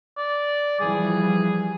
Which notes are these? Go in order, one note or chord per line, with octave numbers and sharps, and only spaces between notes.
D5
E3 F3 G3 G#4